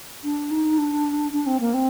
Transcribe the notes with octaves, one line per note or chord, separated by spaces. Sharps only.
D4
D#4
D4
D4
C4
A#3
C4